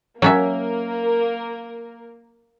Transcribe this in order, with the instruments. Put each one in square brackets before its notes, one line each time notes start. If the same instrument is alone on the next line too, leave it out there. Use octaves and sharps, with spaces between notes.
[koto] F#3 C#4 E5 [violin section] A#3 A#4